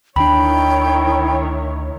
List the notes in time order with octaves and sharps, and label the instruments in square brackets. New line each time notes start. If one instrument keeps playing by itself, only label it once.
[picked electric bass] D2 D4 [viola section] D#3 E4 C#5 [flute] G5 [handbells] B5